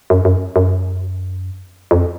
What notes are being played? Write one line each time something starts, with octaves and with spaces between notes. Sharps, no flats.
F#2
F#2
F#2
F2